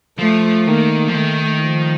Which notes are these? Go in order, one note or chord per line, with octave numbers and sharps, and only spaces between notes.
F3 A3
D#3 A#3
F3
D#3 A3
F3